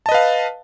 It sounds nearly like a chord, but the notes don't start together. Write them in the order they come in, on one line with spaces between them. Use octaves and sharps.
A5 D#5 B4 F5